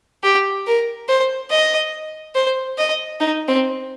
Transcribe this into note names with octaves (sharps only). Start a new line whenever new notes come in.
G4
A#4
C5
D#5
C5
D#5
D#4
C4